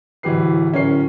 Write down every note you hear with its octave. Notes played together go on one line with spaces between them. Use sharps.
D1 E3 F#3 G4 B4 C7
D1 C#4 A#4 C#5 C7